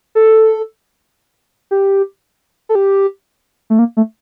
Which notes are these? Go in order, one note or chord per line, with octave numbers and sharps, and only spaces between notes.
A4
G4
A4
G4
A3
A#3
A3